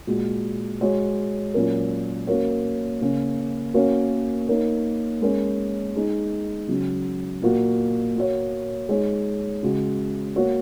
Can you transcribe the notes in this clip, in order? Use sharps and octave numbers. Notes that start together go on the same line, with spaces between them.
A#2 G#3 F#4
G#3 F#4 C#5
A#2 F#3 C#4 A#4
A#3 C#4 F#4 A#4 C#5
C#3 A#3 C#4
A#3 C#4 F#4 A#4 C#5
A#3 D#4 A#4 C#5
G#3 C#4 A#4 C#5
G#3 D#4 G#4
C#3 F#3 C#4
A#2 A#3 F#4
A#3 F#4 C#5
G#3 D#4 G#4 C#5
C#3 G#3 F#4
A#3 F#4 C#5